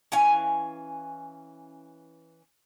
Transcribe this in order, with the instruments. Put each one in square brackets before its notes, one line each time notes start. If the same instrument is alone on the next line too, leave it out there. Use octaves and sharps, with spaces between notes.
[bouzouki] E3 C#4 F5 G#5